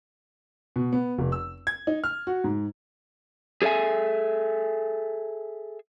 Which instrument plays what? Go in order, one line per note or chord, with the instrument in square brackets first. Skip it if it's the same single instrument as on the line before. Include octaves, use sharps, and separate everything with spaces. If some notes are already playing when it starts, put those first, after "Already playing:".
[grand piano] B2
B3
F1
E6
G#6
D#4
F6
F#4
G#2
[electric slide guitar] G#4 A4 C#5 E5 G#5